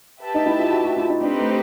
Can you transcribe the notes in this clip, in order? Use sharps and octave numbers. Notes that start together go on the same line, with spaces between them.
G4 B4 E5 A5
D#4
E4
F4
F#4
F#4
F4
D#4
C4 D4 D#4 G4 B4
A3